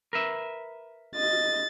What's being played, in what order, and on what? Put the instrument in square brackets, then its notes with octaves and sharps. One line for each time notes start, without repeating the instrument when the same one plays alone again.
[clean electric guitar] A#4 B4 E5
[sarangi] D#5 [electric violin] A6